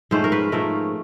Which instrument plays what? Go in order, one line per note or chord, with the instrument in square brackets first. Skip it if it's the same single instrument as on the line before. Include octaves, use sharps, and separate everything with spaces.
[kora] G#2 F3 A3 C#4 C5
A#4
B4
G#2 F3 A3 C#4 A#4